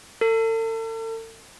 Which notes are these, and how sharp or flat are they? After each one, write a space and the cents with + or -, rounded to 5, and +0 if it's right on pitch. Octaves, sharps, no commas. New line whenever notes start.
A4 +40